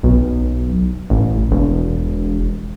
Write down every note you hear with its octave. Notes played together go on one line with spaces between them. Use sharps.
B1
A1
E1